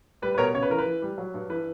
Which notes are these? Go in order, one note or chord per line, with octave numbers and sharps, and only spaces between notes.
G3 B4
B4
B2 A#4 C#5
C#3 C#5
B4
E3 A#4
B4
E3
G3
F#3
G2
E3 B4